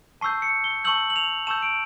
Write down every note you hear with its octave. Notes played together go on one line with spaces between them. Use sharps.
A5 C#6 E6 G6 C7
C#7
G7
A5 C#6 E6 G6 F#7
F#7
F7
A5 C#6 E6 G6 E7
D7